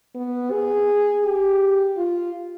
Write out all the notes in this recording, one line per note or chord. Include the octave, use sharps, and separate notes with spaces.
B3
G#4
G4
F4